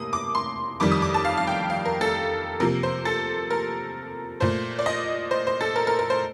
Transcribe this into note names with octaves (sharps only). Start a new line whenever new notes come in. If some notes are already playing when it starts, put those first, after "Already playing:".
Already playing: C3 A#3 D#6
D6
C6
F2 D#3 G3 D6
D#6
D6
A5
F5
F5
G5
F5
A#4
A4
C3 F3 A#3 A#4
C5
A4
A#4
A#2 A3 C5
D5
D#5
C5
C5
A4
A#4
A#4
A#4
C5